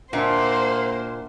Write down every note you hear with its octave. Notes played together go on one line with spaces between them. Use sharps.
A#2 A#3 D4 C5 E5 F#5